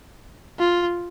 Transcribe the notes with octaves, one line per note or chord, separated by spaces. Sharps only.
F4